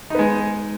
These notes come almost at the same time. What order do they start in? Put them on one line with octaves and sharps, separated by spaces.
D#4 B3 G#3